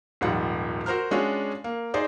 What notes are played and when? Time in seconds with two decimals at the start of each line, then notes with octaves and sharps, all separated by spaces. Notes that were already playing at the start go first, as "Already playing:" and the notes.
0.21 D#1 G#2 F3 G3 F4 F#5
0.86 F#4 A#4 C5 A#5 F6
1.11 G#3 C#4 D4 F4 F#4 G#4
1.64 A#3
1.94 D#4 G#4 C5 D5